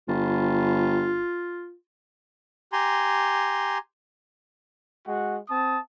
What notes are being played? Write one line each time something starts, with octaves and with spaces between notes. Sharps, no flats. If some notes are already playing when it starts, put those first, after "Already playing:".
G1 F4
G4 G#5 A#5 C6
G#3 F#4 F#5
C4 A5 D#6